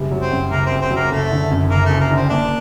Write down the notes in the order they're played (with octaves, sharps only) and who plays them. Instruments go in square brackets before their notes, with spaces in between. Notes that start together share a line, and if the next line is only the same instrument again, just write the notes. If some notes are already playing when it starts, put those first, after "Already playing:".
Already playing: [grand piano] F#1 G3
F#3
[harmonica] C4
[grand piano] F#2
[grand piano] F#1 [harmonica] A#3
[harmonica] C4
[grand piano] F#1
[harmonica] C4
[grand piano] F#3
[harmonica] A#3
[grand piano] F#1 [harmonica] A3
[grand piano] D3
F#2
[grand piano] F#1 [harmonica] A#3
[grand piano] F#1 [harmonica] A3
[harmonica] A#3
[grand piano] D3 [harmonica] C4
[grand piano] A#3 [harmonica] D4